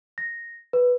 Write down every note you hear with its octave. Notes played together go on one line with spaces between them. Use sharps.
A#6
B4